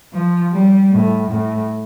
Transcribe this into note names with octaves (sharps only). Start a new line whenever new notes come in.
F3
G3
A2
A2